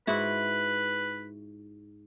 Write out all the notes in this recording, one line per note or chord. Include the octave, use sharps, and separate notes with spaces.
G#2 E4 F#4 B4